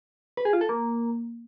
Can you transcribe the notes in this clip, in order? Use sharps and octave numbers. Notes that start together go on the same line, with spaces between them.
B4
G#4
F4
A4
A#3